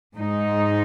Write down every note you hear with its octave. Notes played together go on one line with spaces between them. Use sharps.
G#2 G#3 D#4